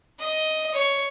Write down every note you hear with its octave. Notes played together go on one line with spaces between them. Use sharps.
D#5
C#5